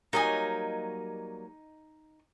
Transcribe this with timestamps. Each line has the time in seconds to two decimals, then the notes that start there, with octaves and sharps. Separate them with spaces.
0.13 F#3 G3 A#3 D#4 D#5 G#5